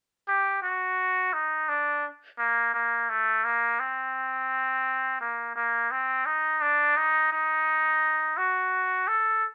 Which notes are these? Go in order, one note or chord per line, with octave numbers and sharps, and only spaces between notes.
G4
F#4
D#4
D4
A#3
A#3
A3
A#3
C4
A#3
A#3
C4
D#4
D4
D#4
D#4
F#4
A4